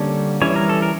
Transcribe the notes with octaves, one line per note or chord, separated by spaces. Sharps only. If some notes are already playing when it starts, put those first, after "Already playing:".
Already playing: D3 G3 A#3 C#4 A4
E3 G3 C#4 C#5
A#4
A4
A#4